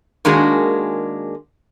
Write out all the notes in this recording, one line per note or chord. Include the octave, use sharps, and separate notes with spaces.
D#3 G#3 A#3 D4 F#4 G#4